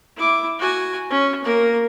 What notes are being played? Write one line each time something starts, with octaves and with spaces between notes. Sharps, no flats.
E4 D6
F#4 G#5
C#4
A#3 A#4